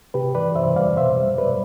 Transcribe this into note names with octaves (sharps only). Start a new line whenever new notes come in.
C3 G4 B4
E3 B4 D5
C3 C5 E5
G3 D5 F5
B2 C5 E5
G3
G3 B4 D5